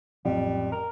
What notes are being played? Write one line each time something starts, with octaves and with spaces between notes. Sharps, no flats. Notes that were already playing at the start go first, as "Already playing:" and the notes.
A1 F2 A2 F#3 G3
A#4